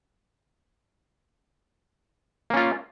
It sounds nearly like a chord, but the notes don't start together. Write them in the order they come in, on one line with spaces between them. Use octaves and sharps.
A#3 C#4 F4